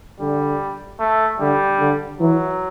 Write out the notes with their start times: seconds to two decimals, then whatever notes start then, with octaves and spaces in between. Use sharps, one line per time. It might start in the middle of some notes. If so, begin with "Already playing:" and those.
0.20 D3 G3
1.00 A3
1.40 D3 G3
1.80 D3
2.20 E3 F#3